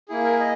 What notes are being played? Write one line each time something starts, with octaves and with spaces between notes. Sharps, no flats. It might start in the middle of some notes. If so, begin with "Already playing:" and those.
A#3 E4 G#4
A#4
D#5